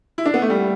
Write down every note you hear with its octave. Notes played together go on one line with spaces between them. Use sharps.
E4
D4
B3
A3
G3